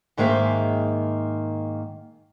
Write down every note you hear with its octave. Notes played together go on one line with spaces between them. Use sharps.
G#2 D#3 G#3 A#3 C5 E5